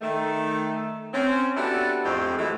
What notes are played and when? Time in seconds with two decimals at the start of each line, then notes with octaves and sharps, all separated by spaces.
0.02 D#3 A3
1.13 C4 C#4
1.56 B3 D4 E4 F#4 G4 A4
2.05 F2 A2 G#3 C4 F4 G4
2.37 A2 E3 F#3 G#3 A3